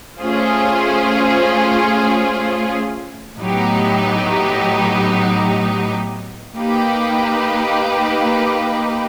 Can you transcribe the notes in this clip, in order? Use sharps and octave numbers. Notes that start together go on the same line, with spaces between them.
A3 C#4 F4 G#4 C5
A2 F#3 B3 D#4 G4
A#3 D#4 G4 B4